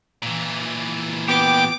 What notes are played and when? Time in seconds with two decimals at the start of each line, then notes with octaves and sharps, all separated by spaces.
0.23 A#2 E3
1.28 B3 G4 D6